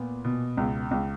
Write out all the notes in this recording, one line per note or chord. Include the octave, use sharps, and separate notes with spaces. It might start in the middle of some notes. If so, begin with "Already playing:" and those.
Already playing: A#2 B3
B2
C#2
C#2